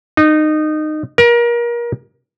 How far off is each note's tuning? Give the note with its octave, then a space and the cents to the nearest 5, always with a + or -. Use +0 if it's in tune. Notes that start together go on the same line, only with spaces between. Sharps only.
D#4 -20
A#4 +30